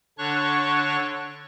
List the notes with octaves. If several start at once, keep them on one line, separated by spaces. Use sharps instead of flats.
D3 D4 C#5 C#6 F#6